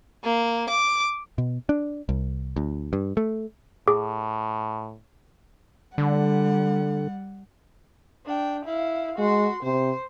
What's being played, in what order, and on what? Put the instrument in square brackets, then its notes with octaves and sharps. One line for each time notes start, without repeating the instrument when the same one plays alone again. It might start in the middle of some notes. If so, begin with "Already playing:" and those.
[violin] A#3
D6
[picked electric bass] B2
D4
C2
D2
G2
A3
[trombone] A2 [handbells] G#4 D6
[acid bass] D3 [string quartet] G3 F#5
[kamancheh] D4 G5
E4 F5
[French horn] G#3 [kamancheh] F#4 C6
[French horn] C3 [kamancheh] C5